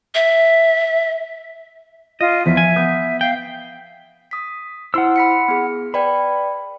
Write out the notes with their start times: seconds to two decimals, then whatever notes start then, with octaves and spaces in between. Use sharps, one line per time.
0.15 E5
2.21 F4 D#5
2.46 E2 F3 E5
2.57 G#5
2.76 B3 D#6 G6
3.21 F5 G5
4.31 D#6 B6
4.94 E4 C5 F#5 C6 E6
5.16 B5 B6 C#7
5.48 B3 G#4
5.94 B4 D5 G5 B5